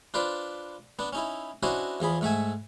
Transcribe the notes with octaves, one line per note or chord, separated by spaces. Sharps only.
D4 F4 B4 C5 D5
B3 D4
C#4 D#4 E4
C#4 D4 E4 F#4 C5 D#5
E2 F3 G#4 B5
G#2 A3 E5 G#5